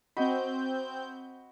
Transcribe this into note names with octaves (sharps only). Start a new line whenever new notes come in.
C4 F#4 D#5 B5 G6